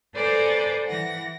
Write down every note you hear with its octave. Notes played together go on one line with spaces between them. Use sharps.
A4 B4 C5 D5 G#5 A#5
E3 F#5 A#6